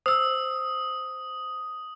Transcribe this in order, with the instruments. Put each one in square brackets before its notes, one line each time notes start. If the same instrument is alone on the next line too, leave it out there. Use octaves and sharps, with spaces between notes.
[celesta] C5 E6 [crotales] D#6